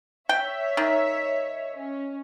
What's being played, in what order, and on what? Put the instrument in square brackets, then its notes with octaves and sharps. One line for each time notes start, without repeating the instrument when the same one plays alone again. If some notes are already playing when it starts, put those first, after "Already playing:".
[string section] C#5 E5 [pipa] G5
[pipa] D#3
[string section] C#4